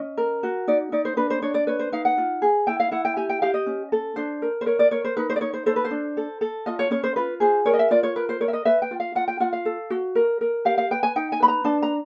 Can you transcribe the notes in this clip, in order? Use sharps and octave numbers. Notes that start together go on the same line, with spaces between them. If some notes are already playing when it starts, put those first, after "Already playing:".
Already playing: C#4 D#5
A#4
F#4
D#4 D5
D#4 D5
C5
D4 B4
C5
D4 C#5
D5
B4 C#5
C5
D#4 F5
F#5
F4
G#4
E4 G5
F5
E4 F#5
G5
G4 G#5
G5
G4 F5
D#5
C#4
A4
D4 C5
A#4
C5
A#4 C#5
D5
A#4 C#5
C5
D#4 B4
C5
D5
D#4 C#5
C5
A4 C5
B4
C5
D4
A4
A4
F4 D#5
C#5
C#4 C#5
C5
F4 B4
G#4 C5
A#4 C#5
D#5
E5
F4 D5
C#5
A#4 B4
C5
A#4 C#5
E5
D#5
B4 E5
G5
F4
F5
F4 F#5
G5
F4 F#5
F5
A4
F#4
A#4
A#4
G4 F5
F5
B4 G5
G#5
D#4 G5
G#5
B4 B5
A#5
D4 A5
A#5